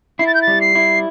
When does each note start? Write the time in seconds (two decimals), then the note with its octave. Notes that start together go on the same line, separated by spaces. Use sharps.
0.19 E4 C7
0.27 A6
0.35 G6
0.42 A6
0.48 G3
0.61 C7
0.75 E4